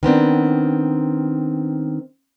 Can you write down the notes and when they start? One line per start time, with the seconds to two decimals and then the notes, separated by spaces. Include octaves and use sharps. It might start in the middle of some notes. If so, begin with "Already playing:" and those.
0.03 D#3 B3 C4 D4